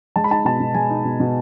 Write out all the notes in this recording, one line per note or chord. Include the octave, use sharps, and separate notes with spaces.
G#3 A5
B5
D#4 A5
B2 A5
B2
G#3 G#5
D#4
B2
B2